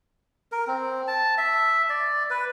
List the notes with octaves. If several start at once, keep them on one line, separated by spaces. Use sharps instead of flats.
A#4
C4
A5
E5
D5
B4